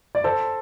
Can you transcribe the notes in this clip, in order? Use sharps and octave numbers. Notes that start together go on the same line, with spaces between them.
D5
A4 C5